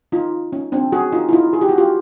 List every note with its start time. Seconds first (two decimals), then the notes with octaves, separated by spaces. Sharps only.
0.12 D#4 F4
0.52 C#4 D#4
0.72 C4 D4
0.92 F#4 G#4
1.12 D#4 F4
1.29 E4
1.33 D#4 F4
1.53 G#4
1.61 G4
1.69 F#4
1.78 F4 G4